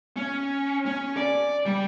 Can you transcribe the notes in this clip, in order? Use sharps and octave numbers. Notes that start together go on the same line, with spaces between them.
C#4
C#4
D5
G3